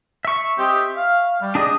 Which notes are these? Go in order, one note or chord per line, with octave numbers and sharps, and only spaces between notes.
E5 C#6
C4 G4 D#5
F5
G3
D4 G4 G#4 D5 D#5 D#6